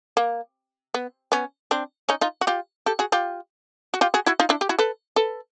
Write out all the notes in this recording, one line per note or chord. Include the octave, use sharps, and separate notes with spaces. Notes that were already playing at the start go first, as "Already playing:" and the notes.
A#3
B3
B3 C#4
C4 D4
C#4 D#4
D#4 F4
F#4
F4 G4
G4 A4
F#4 G#4
F4 G4
F#4
F4 G4
F#4 G#4
E4 F#4
D#4 F4
D4 E4
G4
E4 F#4
A4 B4
A4 B4